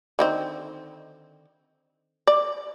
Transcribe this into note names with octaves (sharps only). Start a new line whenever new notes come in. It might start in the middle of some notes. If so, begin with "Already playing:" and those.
D3 D#3 C4
D5